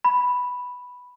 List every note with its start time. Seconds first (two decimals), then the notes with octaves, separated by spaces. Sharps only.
0.05 B5